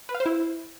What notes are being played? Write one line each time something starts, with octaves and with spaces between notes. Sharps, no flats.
B4
F5
C5
E4